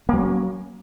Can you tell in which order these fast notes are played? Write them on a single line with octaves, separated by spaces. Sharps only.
A#3 F#3 C#4